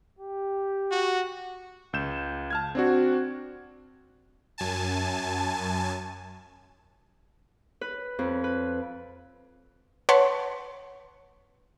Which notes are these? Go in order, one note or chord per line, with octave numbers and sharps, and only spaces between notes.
G4
F#4
C#2 G6 E7
A5 F6 G#6
C4 D4 F#4
F#2 G#5 A5
B4
F2
B4
B4 C#5 F#5 A5 C6 C#6